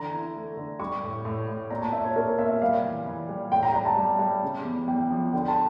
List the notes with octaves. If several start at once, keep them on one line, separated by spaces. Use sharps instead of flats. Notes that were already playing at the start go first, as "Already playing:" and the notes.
Already playing: D3 E3 A#5
E4
A3
D3
G3 C#6
A2
A2
A2
A#2 A#5
A5
A#2 E5
C#5
A#2 A#4
C#5
A#2 E5
E5
G3 F5
E3
E3
G3
A2 G5
A#5
G3 A#5
A5
G3
G3
C#3
E2
E2 G5
F3
D3 G5
A5